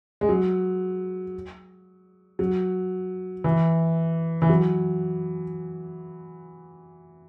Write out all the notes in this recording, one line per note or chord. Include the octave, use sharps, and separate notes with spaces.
G#3
F#3
F#3
E3
E3
F#3